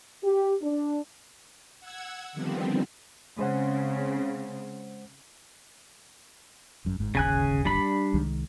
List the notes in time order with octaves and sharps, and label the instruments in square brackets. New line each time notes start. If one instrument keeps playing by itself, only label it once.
[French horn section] G4
D4
[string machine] F#5 E6 G#6
D3 D#3 F3 G3 B3 C4
[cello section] C#3 C4 [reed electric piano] G#3 C5 F#5
[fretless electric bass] G#1 F#2
G1 G#2
[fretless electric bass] D1 G1 D#2 [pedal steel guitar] C#3 G#5 F#6
[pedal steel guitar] G3 D4 B5
[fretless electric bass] C2 D#3 G#3